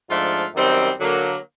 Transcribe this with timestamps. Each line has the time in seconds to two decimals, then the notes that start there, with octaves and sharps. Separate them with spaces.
0.08 G#2 F3 A3 D4 F4
0.54 F#2 D#3 G3 C4 D#4
1.00 D3 F#3 A#3